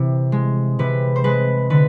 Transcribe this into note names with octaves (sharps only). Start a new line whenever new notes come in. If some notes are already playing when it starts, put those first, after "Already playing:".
Already playing: C3 E3
G#3
C3 B4
C5
G#3 B4
D3 B4